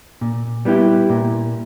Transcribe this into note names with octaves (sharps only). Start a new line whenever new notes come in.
A#2
G3 B3 E4 G4
A#2